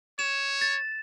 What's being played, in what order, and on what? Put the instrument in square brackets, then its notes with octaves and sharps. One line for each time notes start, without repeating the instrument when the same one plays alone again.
[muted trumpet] C#5 [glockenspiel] E7
[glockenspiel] A6